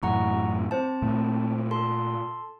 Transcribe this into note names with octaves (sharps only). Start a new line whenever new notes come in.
F#2 A2 E3 F#5 A#5 C#6
C4 C5 A5
A#2 A3
A4 A5 C6